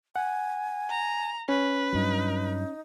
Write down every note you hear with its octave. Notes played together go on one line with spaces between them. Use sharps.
F#5 G#5
A#5
C#4 B4
G2 F#3 D#4